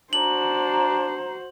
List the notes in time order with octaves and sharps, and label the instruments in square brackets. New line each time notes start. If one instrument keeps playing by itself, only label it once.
[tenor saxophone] D4 [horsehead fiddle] F#4 C5 [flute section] A#5 [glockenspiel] F#7